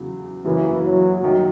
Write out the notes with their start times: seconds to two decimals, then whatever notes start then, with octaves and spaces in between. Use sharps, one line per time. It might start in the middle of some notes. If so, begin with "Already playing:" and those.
Already playing: E2 C#3 F#3
0.45 F#2 C#3 E3 F#3 A#3 C#4
0.84 F#3
1.23 F#2 D#3 F#3